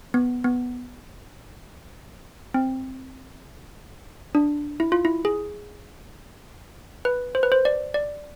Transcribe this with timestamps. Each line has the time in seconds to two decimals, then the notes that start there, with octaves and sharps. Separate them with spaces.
0.14 B3
0.44 B3
2.54 C4
4.35 D4
4.80 E4
4.92 F4
5.05 E4
5.25 G#4
7.05 B4
7.35 C5
7.43 B4
7.52 C5
7.65 D5
7.94 D5